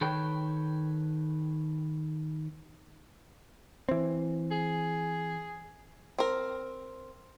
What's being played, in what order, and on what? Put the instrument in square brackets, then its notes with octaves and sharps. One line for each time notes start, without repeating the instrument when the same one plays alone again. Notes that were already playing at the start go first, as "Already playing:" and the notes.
[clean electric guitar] D#3 A4 B4 C#5 G5
[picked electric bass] E3 C4
[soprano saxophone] G#4
[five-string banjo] C4 A#4